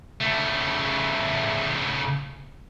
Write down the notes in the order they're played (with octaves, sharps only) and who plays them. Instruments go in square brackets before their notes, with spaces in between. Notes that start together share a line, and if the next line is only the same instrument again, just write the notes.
[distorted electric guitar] C#3 A3